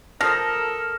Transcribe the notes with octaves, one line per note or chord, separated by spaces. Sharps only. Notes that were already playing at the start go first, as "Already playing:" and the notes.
F3 A4 A#4 D#6 F6 A#6